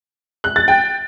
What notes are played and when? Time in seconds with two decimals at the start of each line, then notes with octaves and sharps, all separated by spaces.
0.44 F#6
0.56 A6
0.68 G5